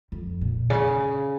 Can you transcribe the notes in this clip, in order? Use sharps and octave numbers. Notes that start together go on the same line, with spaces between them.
F2
A#2
C#3